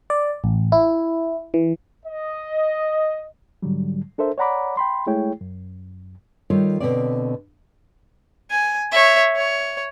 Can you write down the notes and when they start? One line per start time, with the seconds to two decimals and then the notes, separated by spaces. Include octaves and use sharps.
0.10 D5
0.44 A1
0.72 E4
1.54 E3
2.06 D#5
3.62 G#2 D3 F#3 G3
4.18 D4 A4 A#4 C5 E5
4.38 C#5 D5 F#5 A#5 B5 D6
4.77 G5 B5 C6
5.06 G#3 A3 E4 G#4 C#5 G5
5.41 F#2
6.50 D#3 G3 F4 A4 C#5
6.80 B2 D3 D#3 C4 C#5 D5
8.51 G#5
8.92 C#5 E5
9.36 C#5